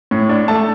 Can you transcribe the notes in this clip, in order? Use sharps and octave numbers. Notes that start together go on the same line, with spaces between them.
A2
D4
A3 A5